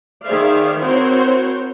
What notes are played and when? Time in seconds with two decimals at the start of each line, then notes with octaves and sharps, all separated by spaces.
0.24 D#3 G#4 C5 D5 E5 F5
0.80 C4 E4 F#4 A#4 C5 C#5